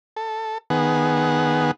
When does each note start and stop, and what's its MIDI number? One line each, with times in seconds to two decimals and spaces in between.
0.17 0.58 69
0.70 1.71 51
0.70 1.71 59
0.70 1.71 68
0.70 1.71 78